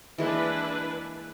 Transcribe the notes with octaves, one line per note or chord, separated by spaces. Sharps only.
E3 G#3 A#3 D4 E4 B4